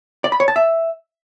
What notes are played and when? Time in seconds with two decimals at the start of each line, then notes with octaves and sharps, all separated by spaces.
0.24 D5
0.32 B5
0.40 C#5
0.48 A5
0.56 E5